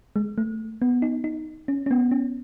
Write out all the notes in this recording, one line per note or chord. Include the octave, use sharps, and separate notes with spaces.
G#3
A3
B3
D#4
D#4
C#4
C#4
B3
C#4